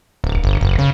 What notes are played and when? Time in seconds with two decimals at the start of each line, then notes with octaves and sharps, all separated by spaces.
0.24 D1
0.44 G1
0.61 F#1
0.78 C#3